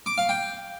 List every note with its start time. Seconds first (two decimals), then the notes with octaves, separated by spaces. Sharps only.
0.06 D6
0.18 F5
0.29 G5